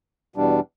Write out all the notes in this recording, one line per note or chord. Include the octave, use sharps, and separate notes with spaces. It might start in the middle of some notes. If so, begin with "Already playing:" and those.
E2 B2 G3 D4